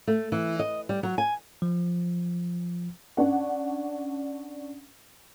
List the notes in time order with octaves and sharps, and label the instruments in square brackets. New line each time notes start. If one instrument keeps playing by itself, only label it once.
[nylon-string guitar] A3
E3
D#5
G3
F#3
G#5
[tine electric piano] F3
[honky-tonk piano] C#4 D4 F#5